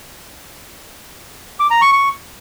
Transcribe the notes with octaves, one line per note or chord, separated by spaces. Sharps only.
D6
A#5
C#6
C#6